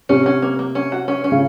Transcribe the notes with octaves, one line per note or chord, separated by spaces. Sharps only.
C3 C#4
C#4
A#3
A#3
C#4
F#4
C#4
C#4
C#3